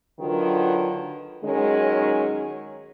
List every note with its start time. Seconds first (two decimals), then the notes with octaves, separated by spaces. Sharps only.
0.19 D3 D#3 F#3 F4 B4
1.44 D#3 F#3 G#3 C#4